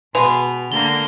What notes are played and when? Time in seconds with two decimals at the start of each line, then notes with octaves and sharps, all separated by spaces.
0.15 B2 G#3 B3 B4 F7
0.72 D3 A#3 G7